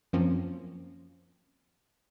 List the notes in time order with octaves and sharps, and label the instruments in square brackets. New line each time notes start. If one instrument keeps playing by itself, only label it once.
[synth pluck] F#2 F3 A#3 C4 C#4